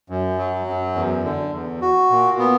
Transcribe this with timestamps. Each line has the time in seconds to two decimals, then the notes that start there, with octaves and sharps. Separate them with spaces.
0.10 F#2
0.38 F#3
0.67 F#2
0.95 E2
1.24 D3
1.53 E2
1.82 F#4
2.10 A#2
2.39 B3